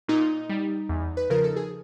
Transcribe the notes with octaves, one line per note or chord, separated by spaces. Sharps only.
A#2 D#4
G3
E2
B4
C#3 F3 A#4
A4
G#4